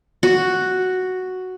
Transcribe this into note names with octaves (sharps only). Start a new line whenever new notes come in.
F#4